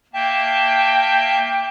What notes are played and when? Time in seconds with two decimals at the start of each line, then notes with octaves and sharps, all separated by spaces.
0.13 A#3 E5 G5 A5